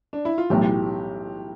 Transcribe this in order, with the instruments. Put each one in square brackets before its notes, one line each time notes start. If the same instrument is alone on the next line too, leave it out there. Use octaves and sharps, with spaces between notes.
[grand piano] D4
E4
F4
[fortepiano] B1 A2 E3 [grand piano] G4